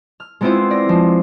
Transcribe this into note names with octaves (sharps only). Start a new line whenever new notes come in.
F6
G#3 B3 C4 E4 F4 C5
D5 A#6
F3 G#3